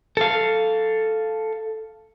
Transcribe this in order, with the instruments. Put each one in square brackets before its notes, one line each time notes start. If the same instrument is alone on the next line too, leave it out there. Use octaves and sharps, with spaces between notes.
[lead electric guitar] A4 F5